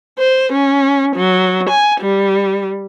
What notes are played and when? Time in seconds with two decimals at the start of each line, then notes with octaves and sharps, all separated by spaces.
0.18 C5
0.52 C#4
1.16 F#3
1.69 G#5
2.00 G3